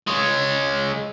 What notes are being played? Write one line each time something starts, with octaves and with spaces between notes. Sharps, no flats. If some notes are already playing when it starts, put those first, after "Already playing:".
G#3 C#5